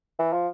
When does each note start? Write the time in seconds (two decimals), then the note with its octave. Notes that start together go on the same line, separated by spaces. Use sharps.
0.19 E3
0.33 F3